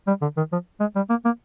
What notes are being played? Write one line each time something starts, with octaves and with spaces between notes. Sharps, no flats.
G3
D3
D#3
F3
G#3
G3
A#3
A#3